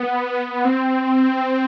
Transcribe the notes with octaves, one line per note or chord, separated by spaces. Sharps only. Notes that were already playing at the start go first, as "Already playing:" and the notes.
Already playing: B3
C4